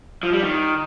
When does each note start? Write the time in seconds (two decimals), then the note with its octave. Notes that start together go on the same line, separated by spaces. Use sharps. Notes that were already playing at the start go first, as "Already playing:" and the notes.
0.23 F3
0.33 G3
0.43 D#3